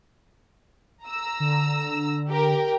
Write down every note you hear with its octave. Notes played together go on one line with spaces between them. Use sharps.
A#5 E6
D3
G4 A#4 G5